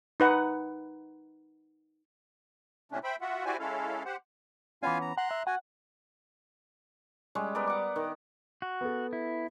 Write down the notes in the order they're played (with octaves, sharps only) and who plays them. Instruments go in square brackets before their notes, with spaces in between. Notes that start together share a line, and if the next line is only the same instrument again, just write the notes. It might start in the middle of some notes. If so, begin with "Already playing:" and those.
[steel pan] D#4 B4 F#5
[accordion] A2 C3 A3 C#4 D4
C5 E5 G5 B5
F4 F#4 E5 F#5
E4 F#4 G4 C5 D5 G#5
G#3 C#4 E4 A4 F5
G4 C5 F#5
[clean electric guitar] E3 B3 C#4 [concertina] F4 F5 G#5
[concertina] A#5
[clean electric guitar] F#5 [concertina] A#5 C6 F#6
[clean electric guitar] E5
[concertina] F#4 G#5 [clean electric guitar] F#5
[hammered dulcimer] G3 G#3 C#4
B3 A#4 D5
F#5 D6
D#3
[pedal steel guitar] F#4
[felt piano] B3 A4
[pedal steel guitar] E4